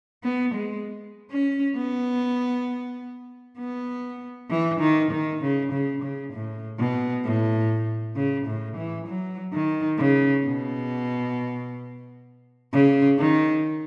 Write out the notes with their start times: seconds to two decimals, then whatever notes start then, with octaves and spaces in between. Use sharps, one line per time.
0.24 B3
0.54 G#3
1.31 C#4
1.76 B3
3.58 B3
4.50 E3
4.80 D#3
5.11 D#3
5.41 C#3
5.72 C#3
6.03 C#3
6.33 A2
6.79 B2
7.25 A2
8.16 C#3
8.47 A2
8.77 E3
9.07 F#3
9.53 D#3
9.98 C#3
10.45 B2
12.73 C#3
13.19 D#3